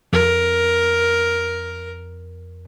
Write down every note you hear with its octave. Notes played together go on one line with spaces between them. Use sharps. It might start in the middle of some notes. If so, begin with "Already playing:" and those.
F2 A#4